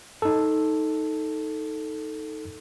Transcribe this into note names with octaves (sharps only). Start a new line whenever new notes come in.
D#4 A4